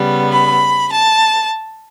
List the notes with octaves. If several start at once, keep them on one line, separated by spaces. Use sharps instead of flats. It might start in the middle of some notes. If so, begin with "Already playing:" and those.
Already playing: C#3 G3 B3
B5
A5